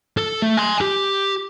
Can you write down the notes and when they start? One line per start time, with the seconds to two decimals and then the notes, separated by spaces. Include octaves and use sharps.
0.17 A4
0.42 A3
0.57 G#5 C6
0.81 G4